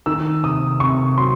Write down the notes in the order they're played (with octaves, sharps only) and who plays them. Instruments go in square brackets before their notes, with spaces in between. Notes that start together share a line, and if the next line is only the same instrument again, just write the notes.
[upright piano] D#3 E6
C3 D#6
C3 C#6
F#3 C6